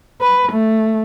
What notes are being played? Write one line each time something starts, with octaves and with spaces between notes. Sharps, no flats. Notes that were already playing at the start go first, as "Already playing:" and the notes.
B4
A3